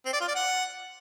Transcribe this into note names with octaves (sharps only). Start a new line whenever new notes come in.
C4
D5
F4
D5
F#5